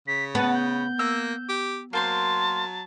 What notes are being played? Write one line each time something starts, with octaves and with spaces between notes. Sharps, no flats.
C#3 B6
B3 B4 A5
G6
A#3 E6
G4
F#3 A#3 C5 A5 C6